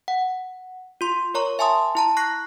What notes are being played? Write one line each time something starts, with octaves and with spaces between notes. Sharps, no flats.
F#5
F4 C6
A#4 C#5 A#5 C#6
E5 G#5 A5 C6 D#6
E4 A5 A#5
C#6 F#6 A#6 C7